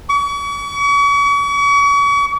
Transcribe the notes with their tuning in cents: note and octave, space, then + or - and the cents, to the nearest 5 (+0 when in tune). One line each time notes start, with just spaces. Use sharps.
C#6 +40